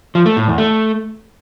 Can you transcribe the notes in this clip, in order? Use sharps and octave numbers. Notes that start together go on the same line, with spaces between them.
F3
A3
A2
E2
A3